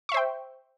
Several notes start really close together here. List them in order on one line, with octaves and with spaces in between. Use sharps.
C#6 E5 C5 G5